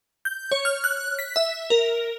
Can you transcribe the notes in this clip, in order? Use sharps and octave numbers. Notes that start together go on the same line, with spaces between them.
G6
C#5
F6
F#6
B6
E5
A#4